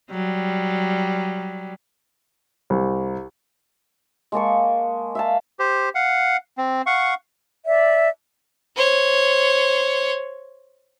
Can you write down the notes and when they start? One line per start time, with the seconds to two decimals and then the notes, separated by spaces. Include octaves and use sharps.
0.11 F#3 G3
2.70 C2
4.32 G#3 A#3 A5 C#6
5.15 E5 F5 A5
5.59 G4 C5
5.95 F5 F#5
6.58 C4
6.87 F5 F#5 C#6
7.65 D5 E5
8.76 C5 C#5